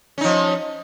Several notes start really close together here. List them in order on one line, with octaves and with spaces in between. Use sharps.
C#4 D#4 F3